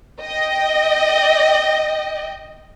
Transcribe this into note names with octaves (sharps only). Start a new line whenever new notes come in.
D#5 G5